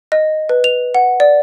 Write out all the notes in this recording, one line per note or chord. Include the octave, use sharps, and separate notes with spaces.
D#5
B4
F7
F#5
D5